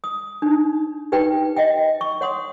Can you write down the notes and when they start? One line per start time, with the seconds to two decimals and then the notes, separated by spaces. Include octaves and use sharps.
0.04 D#6
0.42 D4 D#4
1.12 D#4 G4 B4 G5
1.56 D#5 E5 F#5 G5
2.01 C#6
2.21 C#5 F#5 C6 D#6